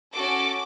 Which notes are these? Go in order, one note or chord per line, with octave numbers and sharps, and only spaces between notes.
C#4 F#4 A4 D6